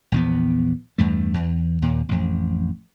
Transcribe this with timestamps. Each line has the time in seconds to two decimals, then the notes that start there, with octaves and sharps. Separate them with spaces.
0.12 A#1 E2 B3
0.98 E2 G2 A3
1.34 E2
1.82 D#2 A#2
2.09 A1 F2